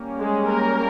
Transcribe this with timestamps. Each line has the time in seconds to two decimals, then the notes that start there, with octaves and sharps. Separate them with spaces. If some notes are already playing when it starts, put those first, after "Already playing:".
Already playing: G3 A#3 C#4
0.19 G#3 G#4
0.48 A#3 A#4